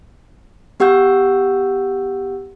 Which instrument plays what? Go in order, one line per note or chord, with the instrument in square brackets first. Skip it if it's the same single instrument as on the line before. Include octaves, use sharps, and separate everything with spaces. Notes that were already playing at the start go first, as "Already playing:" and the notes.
[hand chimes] B3 G4 F#5 E6 G6